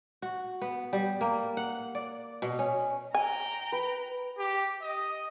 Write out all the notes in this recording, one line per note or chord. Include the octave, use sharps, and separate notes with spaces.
F#4
B3
G3
A#3
F#5
D5
B2
C#4
G5 G#5 A#5
B4
G4
D#5